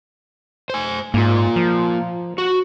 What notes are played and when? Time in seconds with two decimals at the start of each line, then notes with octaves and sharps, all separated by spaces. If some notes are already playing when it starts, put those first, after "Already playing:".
0.70 C5 G#5
1.14 G#2 A#3 F4
1.56 F3
2.38 F#4